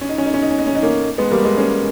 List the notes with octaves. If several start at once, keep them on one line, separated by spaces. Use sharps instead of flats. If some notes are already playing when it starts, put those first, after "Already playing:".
C#4
D#4
C#4
D#4
C#4
D#4
C#4
D#4
C#4
D#4
A#3 C#4
G#3 B3
G3 A#3
G#3 B3
A#3 C#4